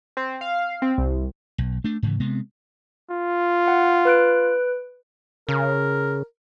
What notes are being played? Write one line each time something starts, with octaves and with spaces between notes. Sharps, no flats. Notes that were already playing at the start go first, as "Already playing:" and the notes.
C4
F5
C4
C2
B1
A3 D4
G#2 C#3 E3
C3 G#3 B3 C4
F4
F#5
B4 F#6 D7
C#3 A#4